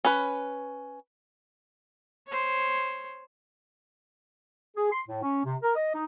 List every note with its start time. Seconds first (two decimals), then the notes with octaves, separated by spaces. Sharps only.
0.05 C#4 B4
2.27 C5 C#5
4.76 G#4
4.92 C6
5.08 A2
5.22 C#4
5.45 C3
5.63 A#4
5.76 D#5
5.94 D#4